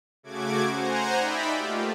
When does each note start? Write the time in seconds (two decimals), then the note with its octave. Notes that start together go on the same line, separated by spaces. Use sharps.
0.23 C#3 A3 F#4 D6 G#6
0.69 C5 F#5 G#5 A#5
1.17 D#4 D5 E5 G5 B5
1.57 A3 A#3 F4 G4